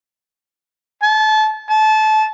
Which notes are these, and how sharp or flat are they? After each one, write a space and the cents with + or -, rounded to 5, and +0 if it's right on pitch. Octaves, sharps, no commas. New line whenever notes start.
A5 -30
A5 -25